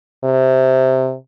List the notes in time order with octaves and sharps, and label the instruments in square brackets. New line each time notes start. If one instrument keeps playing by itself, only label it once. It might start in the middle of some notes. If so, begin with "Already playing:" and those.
[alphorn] C3